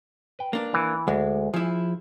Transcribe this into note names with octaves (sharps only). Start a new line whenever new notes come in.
B4 G5
A#3 D4
E3
D2 G#3
F3 E4 G#4